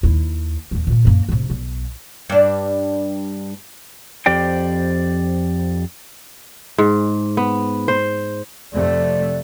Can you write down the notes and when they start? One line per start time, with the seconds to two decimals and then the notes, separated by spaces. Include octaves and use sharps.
0.03 D#2 E4
0.71 D#2 D#3
0.87 A#2 B3
1.05 F#2 A#3
1.29 D1 C3
1.50 B1
2.30 G2 D4
4.26 F2 G4 C5 D5 G5
6.78 G#2
7.37 B3
7.88 C5
8.73 F2 C3 A3 D5